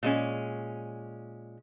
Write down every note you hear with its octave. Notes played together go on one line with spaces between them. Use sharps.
A#2 G#3 C#4